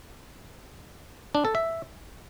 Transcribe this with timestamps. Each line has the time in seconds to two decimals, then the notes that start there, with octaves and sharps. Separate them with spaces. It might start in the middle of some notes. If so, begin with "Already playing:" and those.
1.35 D4
1.45 A4
1.55 E5